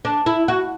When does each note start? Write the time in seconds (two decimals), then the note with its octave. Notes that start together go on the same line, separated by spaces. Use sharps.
0.05 D4
0.26 E4
0.48 F#4